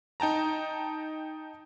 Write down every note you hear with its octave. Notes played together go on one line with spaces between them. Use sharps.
D#4 G5 A5 A#5